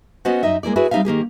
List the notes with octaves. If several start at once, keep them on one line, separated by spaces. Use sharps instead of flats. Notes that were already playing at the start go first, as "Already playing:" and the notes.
B3 C#4 F#4 C5 D#5 F#5
F#2 D#4 D#5 E5
G#3 A#3 E4 D5
E4 F#4 G#4 B4 C#5
G3 C4 D#4 G4 E5 F5
D#3 A#3 G4 G#4